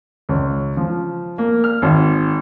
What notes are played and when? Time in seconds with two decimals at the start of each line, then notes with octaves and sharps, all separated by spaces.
0.29 C#2
0.77 F3
1.38 A#3
1.64 F6
1.82 G#1